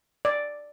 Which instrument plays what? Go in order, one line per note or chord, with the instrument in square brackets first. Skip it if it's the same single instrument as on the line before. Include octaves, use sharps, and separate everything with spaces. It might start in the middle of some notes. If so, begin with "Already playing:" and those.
[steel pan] D5